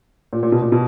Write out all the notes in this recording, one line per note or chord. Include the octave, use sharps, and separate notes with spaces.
A#2
A#2
B2
A#2
B2